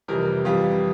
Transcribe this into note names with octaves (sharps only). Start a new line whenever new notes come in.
F2 C3 E3 G3 A#4
F2 E3 G3 F4